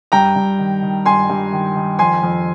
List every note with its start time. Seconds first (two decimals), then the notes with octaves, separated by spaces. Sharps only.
0.12 G2 G5 A#5
0.36 G2
0.59 D#3
0.83 D#3
1.06 G2 G#5 C6
1.30 G2
1.53 D#3
1.76 D#3
1.99 F2 G#5 C6
2.23 F2